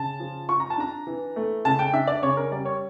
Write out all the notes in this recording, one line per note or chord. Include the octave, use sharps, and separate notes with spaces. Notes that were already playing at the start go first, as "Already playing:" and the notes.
Already playing: C#3 A5
F3
F4 C#6
A#5
A5
D4 A#5
E3
A3
C#3 A5
G5
D4 E5
D5
C#3 C#5
A#4
G3 D5
C#5